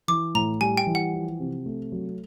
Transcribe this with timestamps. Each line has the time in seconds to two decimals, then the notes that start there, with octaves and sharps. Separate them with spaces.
0.08 E3 D6
0.35 A2 A#5
0.61 G3 G#5
0.77 G5
0.87 E3
0.95 F#5
1.13 F3
1.39 C3
1.66 A3
1.92 F#3